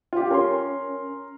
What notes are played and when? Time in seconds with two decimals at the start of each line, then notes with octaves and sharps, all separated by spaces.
0.13 F4 G4
0.31 C#4 A#4 C6